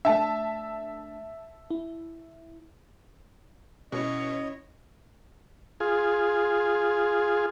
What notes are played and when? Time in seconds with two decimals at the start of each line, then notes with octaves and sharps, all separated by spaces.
0.05 A3 D4 E5 A5
1.70 E4
3.92 B2 C#4 E4 C#5 D#5
5.80 F4 G#4